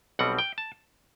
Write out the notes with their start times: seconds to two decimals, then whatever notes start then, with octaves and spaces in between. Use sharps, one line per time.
0.19 B1 B2 G3 C4 F#5
0.39 G5
0.58 A5